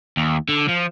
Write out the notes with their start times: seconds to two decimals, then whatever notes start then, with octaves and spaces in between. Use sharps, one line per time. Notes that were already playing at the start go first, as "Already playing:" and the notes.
0.17 D#2
0.49 D3
0.68 F3